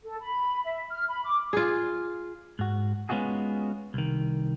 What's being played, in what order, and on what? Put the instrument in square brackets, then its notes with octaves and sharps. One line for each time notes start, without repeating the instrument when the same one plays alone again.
[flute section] A4
B5
E5
F6
B5
D6
[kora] F4 G#4
[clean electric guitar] G#2 F#4
G#3 B3 C#4 F4 F#4 G#4
C2 D#3